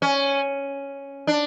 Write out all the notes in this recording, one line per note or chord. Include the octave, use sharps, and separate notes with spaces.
C#4
D4